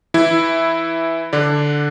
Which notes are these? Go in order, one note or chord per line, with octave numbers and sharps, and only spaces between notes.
E3 E4
D3 D4